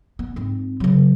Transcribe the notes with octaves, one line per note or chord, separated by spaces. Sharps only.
B3
G#2 C4
C#3 F#3